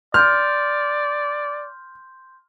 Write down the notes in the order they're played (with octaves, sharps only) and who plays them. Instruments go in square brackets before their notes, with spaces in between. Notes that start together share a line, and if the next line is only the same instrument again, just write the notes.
[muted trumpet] D5 [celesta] C6 G6 [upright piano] F6